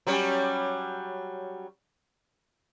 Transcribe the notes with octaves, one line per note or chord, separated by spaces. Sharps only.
F#3 G3 C#4